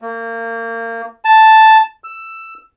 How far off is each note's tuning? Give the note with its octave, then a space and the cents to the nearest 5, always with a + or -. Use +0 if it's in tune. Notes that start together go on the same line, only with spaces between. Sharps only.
A#3 -30
A5 +0
E6 +10